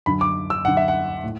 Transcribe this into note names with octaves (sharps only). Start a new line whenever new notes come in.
F#2 D3 B5
D6
E6
F#2 D3 F#5
E5
F#5
A2